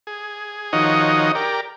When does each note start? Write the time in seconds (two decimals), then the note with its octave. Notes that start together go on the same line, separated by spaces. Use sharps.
0.07 G#4
0.73 D#3 F3 D#4 F#4 C#5 D#5
1.35 G4 A#4 D5